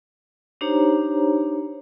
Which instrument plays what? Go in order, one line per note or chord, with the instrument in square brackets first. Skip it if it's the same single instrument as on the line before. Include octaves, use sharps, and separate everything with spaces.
[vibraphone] D4 D#4 G4 C5 C#5 A#5